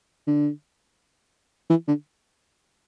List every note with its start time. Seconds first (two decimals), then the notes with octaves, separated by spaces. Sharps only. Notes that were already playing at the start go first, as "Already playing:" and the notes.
0.27 D3
1.69 E3
1.87 D3